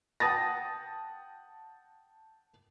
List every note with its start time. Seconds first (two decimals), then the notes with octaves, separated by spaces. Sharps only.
0.20 F#5 G5 A5 D#6 A6 A#6